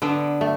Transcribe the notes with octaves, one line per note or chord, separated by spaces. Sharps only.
D3 B3 D4
A3